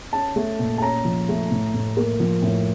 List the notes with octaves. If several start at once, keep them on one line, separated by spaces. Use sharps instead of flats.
C#4 A5
A3
A#2
A5
C#4 A#5
F3
A3
A2
A2
A#3
F3
A2